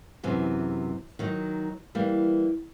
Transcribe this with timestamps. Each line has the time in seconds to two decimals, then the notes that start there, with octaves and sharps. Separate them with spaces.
0.23 F#2 C3 E3
1.19 D#3 F#3 D#4
1.95 E3 G3 A#3